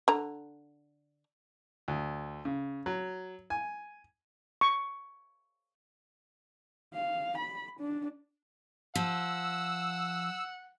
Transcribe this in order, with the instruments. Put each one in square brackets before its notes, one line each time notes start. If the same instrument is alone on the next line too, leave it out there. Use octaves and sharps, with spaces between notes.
[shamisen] D3 A#5
[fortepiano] D2
C#3
F#3
G#5
[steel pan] C#6
[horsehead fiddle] F5
B5
D4
[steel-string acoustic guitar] F3 [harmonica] F#5 [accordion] E6